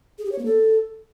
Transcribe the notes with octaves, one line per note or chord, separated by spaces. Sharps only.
G#4
G4
C#5
A#3
A4